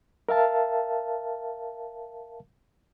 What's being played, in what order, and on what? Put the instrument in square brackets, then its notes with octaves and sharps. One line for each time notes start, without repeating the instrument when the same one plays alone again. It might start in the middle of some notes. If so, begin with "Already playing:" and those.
[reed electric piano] A#4 E5 F5 A5